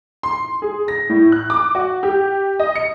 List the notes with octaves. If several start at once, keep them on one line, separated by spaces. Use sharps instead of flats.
C6
G#4
A#6
A2
F#6
D6
F#4
G4
D#5
C#7